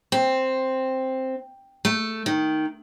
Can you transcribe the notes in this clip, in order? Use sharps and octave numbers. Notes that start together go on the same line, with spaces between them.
C4
A3
D#3